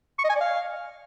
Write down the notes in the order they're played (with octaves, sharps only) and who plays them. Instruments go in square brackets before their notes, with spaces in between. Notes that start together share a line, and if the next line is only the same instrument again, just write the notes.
[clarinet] C#6
D#5
G#5
D5
F5